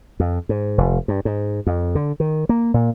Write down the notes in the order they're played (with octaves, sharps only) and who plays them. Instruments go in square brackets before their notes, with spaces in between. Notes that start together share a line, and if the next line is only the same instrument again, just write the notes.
[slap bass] F2
G#2
F1
G2
G#2
F2
D3
D#3
A#3
A#2